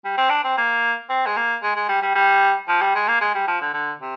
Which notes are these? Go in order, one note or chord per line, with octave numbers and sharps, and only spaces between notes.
G3
C4
D4
C4
A#3
C4
G#3
A#3
G#3
G#3
G3
G3
G3
F3
G3
G#3
A#3
G#3
G3
F3
D3
D3
C3